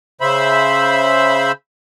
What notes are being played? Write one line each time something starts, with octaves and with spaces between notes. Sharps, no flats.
C#3 C5 E5 B5